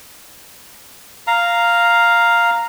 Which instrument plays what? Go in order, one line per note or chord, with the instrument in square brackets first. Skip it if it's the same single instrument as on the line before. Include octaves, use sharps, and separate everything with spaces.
[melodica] F5 A#5